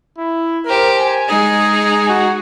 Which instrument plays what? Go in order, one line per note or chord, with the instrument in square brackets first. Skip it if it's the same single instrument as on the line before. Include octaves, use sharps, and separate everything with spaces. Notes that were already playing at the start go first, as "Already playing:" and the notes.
[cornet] E4
[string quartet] G4 C5 [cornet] A#4
[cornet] G#5
[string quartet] G#3 D#4 G#4
[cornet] F#4